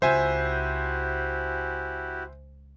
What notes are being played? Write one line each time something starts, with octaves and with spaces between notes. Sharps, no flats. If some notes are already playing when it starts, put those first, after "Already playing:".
C#2 E4 F#4 G4 C5 E5 G#5